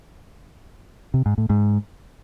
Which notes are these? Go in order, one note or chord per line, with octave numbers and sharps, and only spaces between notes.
C3
G#2
A2
G#2